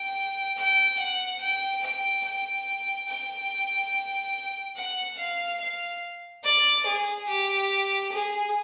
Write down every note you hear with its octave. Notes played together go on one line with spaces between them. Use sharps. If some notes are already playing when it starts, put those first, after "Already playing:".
Already playing: G5
G5
F#5
G5
G5
G5
G5
F#5
F5
F5
D5
G#4
G4
G#4